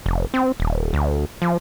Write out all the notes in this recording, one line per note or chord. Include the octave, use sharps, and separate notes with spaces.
F1
C4
D#1
D2
F3